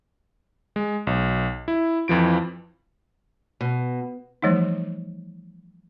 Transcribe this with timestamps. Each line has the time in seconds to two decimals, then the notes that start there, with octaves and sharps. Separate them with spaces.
0.76 G#3
1.07 B1
1.68 E4
2.08 F2 E3 F3 D7
3.61 B2
4.42 E3 F3 G3 A3 D#4